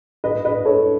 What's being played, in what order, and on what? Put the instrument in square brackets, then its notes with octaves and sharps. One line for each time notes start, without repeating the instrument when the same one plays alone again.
[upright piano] B4 D#5
B4 D#5
A4 C#5